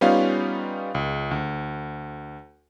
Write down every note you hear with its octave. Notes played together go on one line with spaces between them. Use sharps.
G3 B3 C#4 D#4 F4 F5
C#2
D2